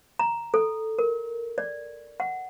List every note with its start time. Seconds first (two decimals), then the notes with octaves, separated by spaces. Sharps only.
0.19 A#5
0.54 A4
0.99 A#4
1.58 D5
2.20 F#5